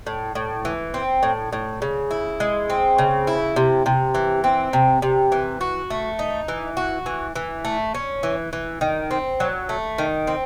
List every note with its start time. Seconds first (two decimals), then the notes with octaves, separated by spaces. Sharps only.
0.07 A2
0.35 A2
0.65 E3
0.94 C4
1.23 A2
1.53 A2
1.82 C#3
2.11 E4
2.40 G#3
2.70 C4
2.98 C#3
3.27 E4
3.56 C3
3.86 C3
4.15 E3
4.44 C4
4.73 C3
5.02 C3
5.32 E3
5.61 F#4
5.90 A3
6.19 D#4
6.48 E3
6.77 F#4
7.06 E3
7.35 E3
7.65 A3
7.95 C#4
8.23 E3
8.53 E3
8.81 D#3
9.11 C4
9.40 F#3
9.69 A3
9.98 D#3
10.27 C4